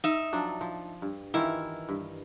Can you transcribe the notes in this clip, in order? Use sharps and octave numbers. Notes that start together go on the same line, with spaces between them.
D#4 E5
F3 F#3 D4
F3
G2
D#3 E3 E4 F4
G2